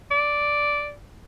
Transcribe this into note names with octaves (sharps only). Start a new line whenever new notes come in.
D5